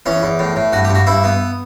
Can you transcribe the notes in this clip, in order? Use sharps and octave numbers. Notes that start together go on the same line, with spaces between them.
E2 C#4
E2
A2
A2
G2 F#4
G4
G2
F#4
G2 E4
B3